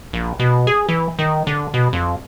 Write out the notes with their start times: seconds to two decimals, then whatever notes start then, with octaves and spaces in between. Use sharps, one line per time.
0.13 A#1
0.39 B2
0.67 G#4
0.89 E3
1.19 D#3
1.47 D3
1.74 B2
1.93 F2